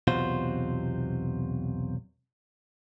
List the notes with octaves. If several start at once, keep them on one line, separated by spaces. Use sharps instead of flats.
B1 E2 C3 F4 F#4 C5